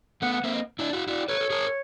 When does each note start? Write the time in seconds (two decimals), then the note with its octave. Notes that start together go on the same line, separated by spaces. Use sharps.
0.22 A3 B3 F#5
0.33 F#5
0.44 A#3 C4 E5
0.54 D#5
0.79 D4 E4
0.93 E4 F#4
1.07 E4 F#4 D5
1.28 A4 B4 C#5
1.40 A4
1.50 G#4 A#4